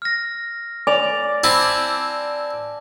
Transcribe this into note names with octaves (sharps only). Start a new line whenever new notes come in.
F6 A#6
D5 G#5 F7
C4 E4 A5